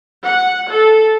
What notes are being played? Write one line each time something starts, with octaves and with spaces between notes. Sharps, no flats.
F#5
A4